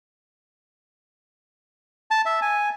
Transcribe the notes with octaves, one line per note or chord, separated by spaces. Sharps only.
A5
E5
G#5